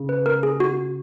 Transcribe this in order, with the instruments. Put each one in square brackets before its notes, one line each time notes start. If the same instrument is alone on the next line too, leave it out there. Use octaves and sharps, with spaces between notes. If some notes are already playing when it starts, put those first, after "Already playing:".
Already playing: [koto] C#3
[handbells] B4
A#4
G#4
F#4